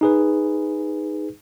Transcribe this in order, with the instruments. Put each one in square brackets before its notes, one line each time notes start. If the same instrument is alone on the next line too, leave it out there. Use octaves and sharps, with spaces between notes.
[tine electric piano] D#4 G#4 B4